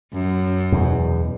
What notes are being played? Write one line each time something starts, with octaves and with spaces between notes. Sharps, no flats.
F#2
E2 B2